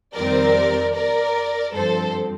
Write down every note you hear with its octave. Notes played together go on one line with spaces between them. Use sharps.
F2 D#3 G3 C4 A#4 D5
A#4 D5
G2 F3 C4 A4 C5